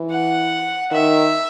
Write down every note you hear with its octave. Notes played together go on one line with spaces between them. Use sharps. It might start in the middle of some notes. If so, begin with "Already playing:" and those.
Already playing: E3
F#5
D#3 E5